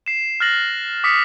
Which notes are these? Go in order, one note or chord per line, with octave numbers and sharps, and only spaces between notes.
C7 E7
F6 F#6 A6 A#6 F#7
D6 D#6 B6 C#7